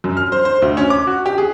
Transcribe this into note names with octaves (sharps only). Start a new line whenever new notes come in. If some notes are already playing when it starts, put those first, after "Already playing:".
F#2
F6
C5
C5
D2
C#4
D6
F#4
G4
G#4